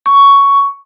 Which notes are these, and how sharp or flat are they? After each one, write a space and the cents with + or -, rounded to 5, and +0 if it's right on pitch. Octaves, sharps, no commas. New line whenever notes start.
C#6 +10